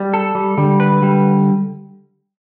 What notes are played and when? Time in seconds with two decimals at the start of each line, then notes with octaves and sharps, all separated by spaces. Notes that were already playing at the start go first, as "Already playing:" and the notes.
Already playing: G3
0.14 A4
0.35 G3
0.57 D3 G3
0.80 B4
1.03 G3